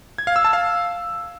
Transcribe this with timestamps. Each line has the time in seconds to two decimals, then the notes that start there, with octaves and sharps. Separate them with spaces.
0.18 G#6
0.27 F5
0.36 E6
0.45 A5
0.53 F5